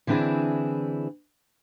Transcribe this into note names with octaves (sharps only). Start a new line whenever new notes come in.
D3 E3 C4 D4 E4 G#4